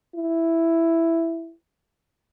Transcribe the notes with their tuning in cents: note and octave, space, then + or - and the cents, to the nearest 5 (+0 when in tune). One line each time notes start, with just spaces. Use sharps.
E4 +5